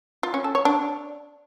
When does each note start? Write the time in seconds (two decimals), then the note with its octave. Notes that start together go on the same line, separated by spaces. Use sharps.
0.23 F4
0.34 C#4
0.44 A4
0.55 C#5
0.65 D4